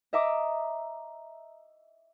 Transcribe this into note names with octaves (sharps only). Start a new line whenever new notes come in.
D#5 E5 A#5 D6